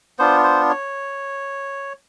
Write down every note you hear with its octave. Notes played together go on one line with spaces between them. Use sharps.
B3 D4 F4 C5
C5
C#5